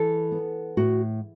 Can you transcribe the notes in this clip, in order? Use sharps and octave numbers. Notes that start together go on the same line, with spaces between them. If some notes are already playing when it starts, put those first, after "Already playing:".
Already playing: E3 A4
B3
A2 F#4